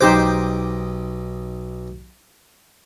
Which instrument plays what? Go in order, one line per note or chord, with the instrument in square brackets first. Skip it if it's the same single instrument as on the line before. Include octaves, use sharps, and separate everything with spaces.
[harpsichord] B1 D#5 D6 [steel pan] D#4 G4 C5